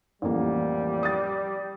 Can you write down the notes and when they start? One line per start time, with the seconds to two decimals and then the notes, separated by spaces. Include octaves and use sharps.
0.22 A1 F2 G3 A#3
1.03 D#6 A6